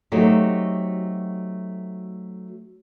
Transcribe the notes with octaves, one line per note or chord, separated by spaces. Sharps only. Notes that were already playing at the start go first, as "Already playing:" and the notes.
F#3 A3 C4 D#4 F#4 G4